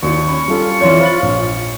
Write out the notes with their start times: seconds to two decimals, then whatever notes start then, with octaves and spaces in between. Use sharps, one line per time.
0.03 D#2 E4 F#4 D5 C#6
0.28 C#4 B5
0.48 G3 C#4 F4 A4
0.80 F2 E3 C#5 D5 C6
1.01 G#4 C5 B5 A6 F#7
1.22 A#1